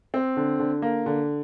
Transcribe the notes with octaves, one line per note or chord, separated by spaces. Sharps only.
C4
D3
D3
A#3
D3